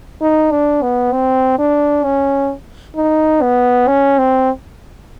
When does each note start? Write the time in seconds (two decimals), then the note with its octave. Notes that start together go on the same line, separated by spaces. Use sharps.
0.21 D#4
0.52 D4
0.82 B3
1.13 C4
1.59 D4
2.04 C#4
2.96 D#4
3.42 B3
3.88 C#4
4.18 C4